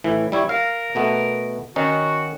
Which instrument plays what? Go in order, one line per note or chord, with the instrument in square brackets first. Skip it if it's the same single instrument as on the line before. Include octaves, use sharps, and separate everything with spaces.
[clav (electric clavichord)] A2 E3
G3 E4 C#5
[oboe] A#4 [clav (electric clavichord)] F5
[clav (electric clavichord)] B2 A3 B3
[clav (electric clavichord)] D#3 C#4 D#4 [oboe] F#4